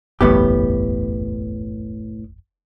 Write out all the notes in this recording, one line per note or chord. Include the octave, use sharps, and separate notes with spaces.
F#1 B1 E2 A2 B3 G4